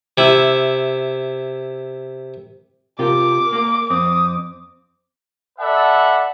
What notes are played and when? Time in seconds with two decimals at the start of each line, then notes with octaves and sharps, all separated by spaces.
0.18 C3 E4
2.99 C3 F4 G4 A#4 D6
3.53 A#3
3.90 F2 C4 D#6
5.59 A4 B4 D5 E5 F#5 A5